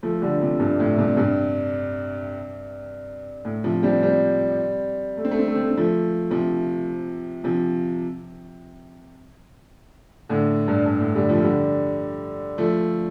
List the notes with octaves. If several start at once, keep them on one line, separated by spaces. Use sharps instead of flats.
F3 A3
D3 G3
C3 F3
G2 C3
A2
G2 C3
G2 C3
A2
C3 F3
G3 C4
G3 C4
A3
C4
A3
C4
A3
C4
A3
C4
F3 A3
C3 F3
C3 F3
A2 D3
G2
G2
A2
D3 G3
F3 A3
D3 G3
F3 A3